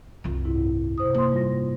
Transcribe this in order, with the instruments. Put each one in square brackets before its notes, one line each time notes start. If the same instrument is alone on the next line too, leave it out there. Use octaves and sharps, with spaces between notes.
[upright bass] C2 D#3 [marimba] F#2 F4
[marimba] G#2 E4
C3 C5 D#6
[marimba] A#3 C6 [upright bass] D#4
[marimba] G3 F4 A#6